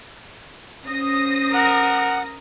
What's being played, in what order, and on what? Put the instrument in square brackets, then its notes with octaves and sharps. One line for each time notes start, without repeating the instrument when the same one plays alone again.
[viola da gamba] C#4 C5 [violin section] D#6 A#6
[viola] A#4 [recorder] F#5